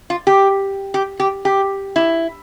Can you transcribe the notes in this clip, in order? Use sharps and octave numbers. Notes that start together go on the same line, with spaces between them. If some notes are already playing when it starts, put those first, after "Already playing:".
F4
G4
G4
G4
G4
E4